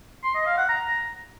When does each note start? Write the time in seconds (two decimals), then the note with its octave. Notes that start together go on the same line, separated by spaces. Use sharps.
0.24 C6
0.35 D#5
0.46 F5
0.58 F#5
0.69 A#5